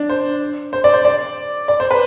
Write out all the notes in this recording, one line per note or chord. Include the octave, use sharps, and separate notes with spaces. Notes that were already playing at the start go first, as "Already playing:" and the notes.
Already playing: D4
C5
C5
D5
C5
D5
D5
C5
B4